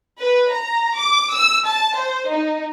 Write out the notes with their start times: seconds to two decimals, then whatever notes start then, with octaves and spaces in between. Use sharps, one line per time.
0.21 B4
0.53 A#5
1.00 D6
1.35 E6
1.69 A5
1.99 C5
2.32 D#4